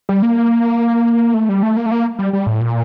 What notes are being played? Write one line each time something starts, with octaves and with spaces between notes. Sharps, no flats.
G3
A#3
A3
G3
A3
A#3
A3
A#3
G3
G3
A2
A#2